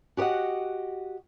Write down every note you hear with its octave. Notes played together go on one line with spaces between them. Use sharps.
F#4 G4 A#4 D#5 F#5